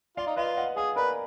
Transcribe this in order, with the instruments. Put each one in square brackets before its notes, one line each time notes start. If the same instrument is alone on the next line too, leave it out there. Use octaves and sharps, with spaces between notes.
[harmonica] F4 [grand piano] D5 F5
[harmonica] D#4
[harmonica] F4 [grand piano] B4 D#5
[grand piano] D#5 F#5
[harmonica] G#4 [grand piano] F5 G#5
[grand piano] A#4 D5 [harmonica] B4